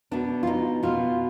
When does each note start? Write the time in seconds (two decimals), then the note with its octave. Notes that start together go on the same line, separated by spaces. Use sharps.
0.11 B2 B3 D4
0.43 F4
0.47 D#4
0.83 B2 B3 F4